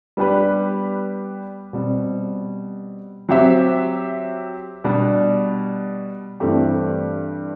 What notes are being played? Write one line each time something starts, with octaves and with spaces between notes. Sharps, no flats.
G3 B3 D4 G4 B4
B2 G3 C4
F#3 C4 G4 C5 E5
B2 G3 D4
G2 E3 A3 C4 G4